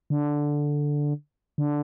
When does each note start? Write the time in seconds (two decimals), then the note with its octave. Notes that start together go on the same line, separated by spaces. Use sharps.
0.10 D3
1.58 D3